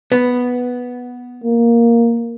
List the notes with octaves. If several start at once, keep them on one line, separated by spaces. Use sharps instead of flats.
B3
A#3